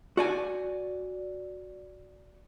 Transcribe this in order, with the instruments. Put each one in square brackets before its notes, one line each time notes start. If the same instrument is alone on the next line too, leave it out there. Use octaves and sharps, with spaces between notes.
[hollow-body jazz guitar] F#4 D5 G#5